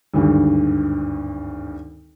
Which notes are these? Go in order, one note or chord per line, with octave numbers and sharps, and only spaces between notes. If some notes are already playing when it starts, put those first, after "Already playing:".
G#1 D2 G2